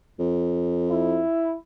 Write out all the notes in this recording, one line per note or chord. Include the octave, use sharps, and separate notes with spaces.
F2
E4